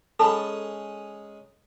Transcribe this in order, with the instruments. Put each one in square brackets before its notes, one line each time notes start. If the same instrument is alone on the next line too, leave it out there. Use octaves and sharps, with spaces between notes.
[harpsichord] G#3 C#4 D#4 [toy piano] A4 [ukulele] A5 B5